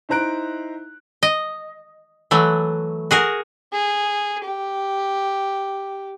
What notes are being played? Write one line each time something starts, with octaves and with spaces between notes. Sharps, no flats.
D#4 E4 C5 A#5 F#6 D7
D#5
E3 F#3 A3
F#4 G#4 A#4
G#4
G4